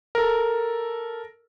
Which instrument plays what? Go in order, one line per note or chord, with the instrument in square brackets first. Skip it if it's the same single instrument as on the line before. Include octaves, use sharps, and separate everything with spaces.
[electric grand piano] A4 A#4